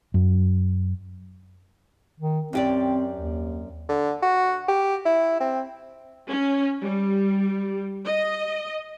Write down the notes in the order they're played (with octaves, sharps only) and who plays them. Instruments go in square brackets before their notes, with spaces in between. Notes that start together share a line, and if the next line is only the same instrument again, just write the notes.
[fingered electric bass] F#2
[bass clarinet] D#3
[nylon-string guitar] F#2 G4 D5 [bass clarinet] C4
[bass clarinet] D#2
[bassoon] D3
F#4
G4
E4
C4
[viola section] C#4
G3
D#5